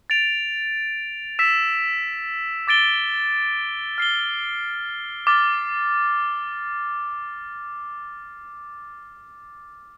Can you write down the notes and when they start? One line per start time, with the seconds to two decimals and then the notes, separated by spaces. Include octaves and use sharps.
0.10 A6 D7 F7
1.39 E6 B6 E7
2.67 D6 A6 D7 G7
3.98 F6 C7 G7
5.27 D6 F6 A6